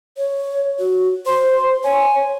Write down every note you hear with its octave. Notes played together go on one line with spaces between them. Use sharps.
C#5
F#4
C5 C6
C#5 G#5